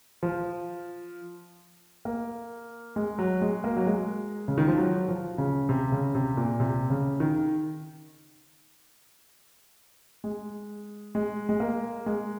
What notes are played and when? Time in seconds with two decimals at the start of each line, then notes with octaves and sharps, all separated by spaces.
0.23 F3
2.05 A#3
2.96 G#3
3.19 F#3
3.42 G#3
3.64 A#3
3.77 F#3
3.86 G#3
4.48 C#3
4.58 D#3
4.68 F3
4.78 F#3
5.09 F3
5.38 C#3
5.69 C3
5.92 C#3
6.15 C3
6.37 A#2
6.60 C3
6.90 C#3
7.20 D#3
10.24 G#3
11.15 G#3
11.49 G#3
11.60 A#3
12.06 G#3